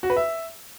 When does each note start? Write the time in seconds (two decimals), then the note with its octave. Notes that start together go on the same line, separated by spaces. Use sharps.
0.03 F#4
0.10 B4
0.16 E5